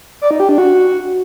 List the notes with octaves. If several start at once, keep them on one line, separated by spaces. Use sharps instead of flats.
D5
D#4
G4
D4
F#4